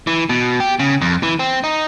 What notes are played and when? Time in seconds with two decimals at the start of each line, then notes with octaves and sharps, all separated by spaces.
0.07 E3
0.29 B2
0.60 G4
0.79 C#3
1.01 F2
1.23 E3
1.39 C4
1.64 D#4